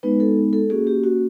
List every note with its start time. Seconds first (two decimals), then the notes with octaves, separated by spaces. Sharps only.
0.03 G#3 B3 D#4 B4
0.20 A4
0.53 A4
0.70 A#3 C#4 F#4 G#4
0.87 G4
1.04 F#4